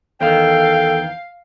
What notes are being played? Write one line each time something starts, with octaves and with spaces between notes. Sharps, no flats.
E2 D#3 A4 F5 G5